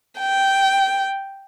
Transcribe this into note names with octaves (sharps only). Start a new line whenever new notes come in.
G5